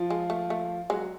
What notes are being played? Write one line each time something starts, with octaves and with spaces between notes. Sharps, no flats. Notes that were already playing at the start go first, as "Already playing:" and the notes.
Already playing: F3 F4
G#3
A3
A3
F#3 G#3 F#4